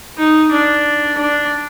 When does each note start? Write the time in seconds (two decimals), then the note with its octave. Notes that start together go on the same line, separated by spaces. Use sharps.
0.18 D#4
0.52 D4
1.17 D4